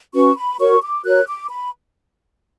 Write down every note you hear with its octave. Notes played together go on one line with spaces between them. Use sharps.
C#4 F#4 B4 C#6
B5
F#4 A#4 C#5 C#6
D6
F#4 A#4 C#5 F#6
D6
B5